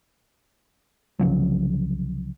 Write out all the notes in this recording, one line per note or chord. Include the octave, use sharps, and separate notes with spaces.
C2 C#3 F3 F#3